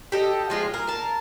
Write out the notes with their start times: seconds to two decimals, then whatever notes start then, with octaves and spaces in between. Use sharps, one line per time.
0.12 G4 A4 D#5
0.50 F3 G#3 F4
0.74 A#4
0.87 A#4 A5